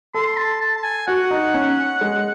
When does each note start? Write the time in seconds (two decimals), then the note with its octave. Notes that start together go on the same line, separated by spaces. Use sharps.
0.14 A4 C6
0.37 A5
0.61 A5
0.77 A5
0.84 G#5
1.07 F#4 F#5
1.31 D#4
1.54 C#4
2.01 G#3